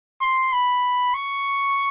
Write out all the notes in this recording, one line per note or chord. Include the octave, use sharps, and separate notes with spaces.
C6
B5
C#6